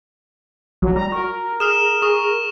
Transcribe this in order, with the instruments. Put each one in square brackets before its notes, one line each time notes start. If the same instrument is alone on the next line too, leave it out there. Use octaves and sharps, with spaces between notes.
[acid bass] A#1 [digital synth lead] F#3
[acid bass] G3 [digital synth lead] A#5
[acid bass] F#4 [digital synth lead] A#4
[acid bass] G#4 [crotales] D#6 F6 E7
[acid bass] G#4 [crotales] C#6 D#6